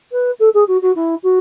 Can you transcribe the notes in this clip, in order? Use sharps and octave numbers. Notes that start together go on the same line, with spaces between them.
B4
A4
G#4
F#4
F#4
E4
F#4